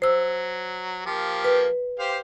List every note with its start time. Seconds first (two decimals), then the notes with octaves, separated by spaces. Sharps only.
0.02 F#3 C5 E6
1.06 F3 A#3 G4
1.44 B4
1.99 G4 C5 F5